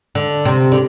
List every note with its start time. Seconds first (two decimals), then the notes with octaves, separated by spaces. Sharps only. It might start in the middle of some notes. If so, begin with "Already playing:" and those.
0.15 D3
0.45 C3
0.72 D3